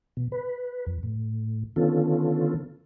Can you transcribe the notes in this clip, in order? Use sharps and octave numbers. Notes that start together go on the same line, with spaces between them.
B2
B4
F2
A2
D3 D#3 B3 C#4 F4 A4